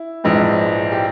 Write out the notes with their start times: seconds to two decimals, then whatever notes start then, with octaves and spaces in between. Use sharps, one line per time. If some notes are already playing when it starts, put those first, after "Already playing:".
Already playing: E4
0.24 A#1 G#2 E3 G#3 C4
0.92 G4